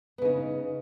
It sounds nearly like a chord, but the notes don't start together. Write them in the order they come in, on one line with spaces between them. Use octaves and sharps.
B3 C#3 D#4